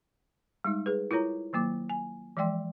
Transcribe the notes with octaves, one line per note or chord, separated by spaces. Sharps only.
G3 G#3 D#4
G#4 B4
E4 F4 A#4 C#5 A#5
D#3 F#3 A#3 D6
G#5
E3 F3 G#3 D5 G5 C6